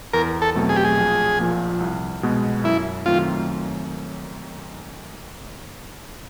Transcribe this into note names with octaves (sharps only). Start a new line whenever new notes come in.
E2 A#4
A4
B2 F#3 A3 C4
G#4
G4
G#4
A#1
A#2 F3 A#3
C2
B2 G#3 B3
F#2 E4
D#3 F#3 A3 C4 F4